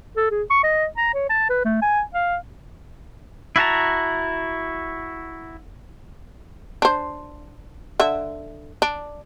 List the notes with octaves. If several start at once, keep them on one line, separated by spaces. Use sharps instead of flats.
A4
G#4
C#6
D#5
A#5
C#5
A5
B4
A3
G#5
F5
E4 F#4 A5 A#5
D4 C5
D3 E5
D4